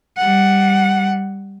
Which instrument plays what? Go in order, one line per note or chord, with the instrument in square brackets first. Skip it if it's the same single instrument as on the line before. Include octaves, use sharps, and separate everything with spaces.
[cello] G3 F#5